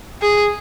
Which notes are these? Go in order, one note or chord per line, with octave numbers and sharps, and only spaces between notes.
G#4